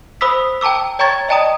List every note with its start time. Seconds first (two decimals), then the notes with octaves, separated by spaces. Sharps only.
0.21 C5 B5 D#6 E6 B6
0.61 G5 A5 A#5 D6 E6
0.99 C#5 G5 A#5 C#6 G#6 A6
1.29 D5 D#5 G5 A5 A#5 D#6